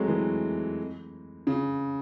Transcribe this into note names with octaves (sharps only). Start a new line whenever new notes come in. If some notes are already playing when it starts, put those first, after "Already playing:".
Already playing: F#3 G#3 A3 C4
E3
C#3